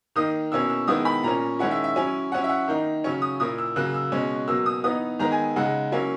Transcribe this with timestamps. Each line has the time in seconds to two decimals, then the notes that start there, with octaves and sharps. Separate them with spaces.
0.16 D#3 A#3 D#4 D#6
0.52 B2 A#3 C#4 E4 E6
0.70 E6
0.87 D#3 G#3 B3 E4 D#6
1.05 B5
1.23 A#2 A#3 C#4 A#5
1.59 D#3 G#3 C#4 E4 F#5
1.71 E5
1.84 E5
1.96 F#3 C#4 E4 G#5
2.32 F#3 F#5
2.35 C#4 E4
2.44 E5
2.49 F#5
2.68 D#3 A#3 D#4
3.04 C#3 F#3 C#4 C#6
3.22 D#6
3.40 A#2 A#3 E4 D#6
3.58 E6
3.76 C#3 F#3 A#3 F#6
3.94 E6
4.12 B2 G#3 C#4
4.48 B2 F#3 A#3 E6
4.66 D#6
4.84 E3 B3 D#4 D#6
5.19 D#3 G#3 B3 A#5
5.32 G#5
5.56 C#3 G#3 D#4 F#5
5.92 F#3 A#3 C#4 E4